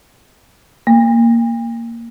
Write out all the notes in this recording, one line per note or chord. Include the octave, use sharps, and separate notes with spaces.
A#3